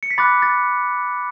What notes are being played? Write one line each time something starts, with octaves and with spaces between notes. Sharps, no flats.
C#7
B6
B5 D6 F#6 A6
A6